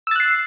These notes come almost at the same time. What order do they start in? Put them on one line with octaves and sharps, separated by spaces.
E6 A6 F#6 C7